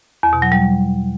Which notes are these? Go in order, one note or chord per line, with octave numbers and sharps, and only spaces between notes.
E2
B2
F#3
G3